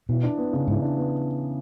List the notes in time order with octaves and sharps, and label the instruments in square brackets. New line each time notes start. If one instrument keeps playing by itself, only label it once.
[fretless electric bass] B2 [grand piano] E3
[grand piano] D4
B3
C#3
[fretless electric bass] G#2 [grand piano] E3
[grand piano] D4
B3